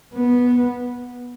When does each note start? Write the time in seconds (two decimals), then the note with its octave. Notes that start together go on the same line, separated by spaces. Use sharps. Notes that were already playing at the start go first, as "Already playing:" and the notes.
0.15 B3